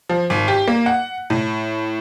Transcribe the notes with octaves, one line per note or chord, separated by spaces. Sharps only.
F3
G#1
G4
A#3
F#5
A2